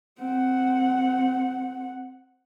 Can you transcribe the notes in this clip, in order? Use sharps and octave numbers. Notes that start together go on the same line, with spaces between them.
C4 F#5